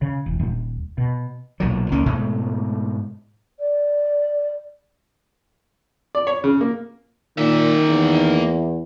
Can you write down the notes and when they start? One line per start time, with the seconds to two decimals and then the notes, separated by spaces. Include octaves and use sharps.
0.02 C#3
0.26 E1
0.40 D#1
0.98 B2
1.60 B1 A#2 F#3
1.92 C#2 A#3 C#4
2.06 G#2 B2 G#3 A3
3.59 D5
6.15 D5
6.27 C#5
6.44 C#3
6.61 A#3
7.38 A#2 D#3 A#3 E5
7.88 E2